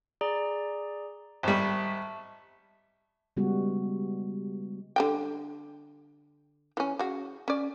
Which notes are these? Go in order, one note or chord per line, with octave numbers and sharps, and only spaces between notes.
G#4 D5 A#5
G#1 G3 E5 A5 C#6
C#3 G3 G#3 B3 F#4 G4
D3 G3 G5
E3 C#4
C#3 F#4
C#4 D5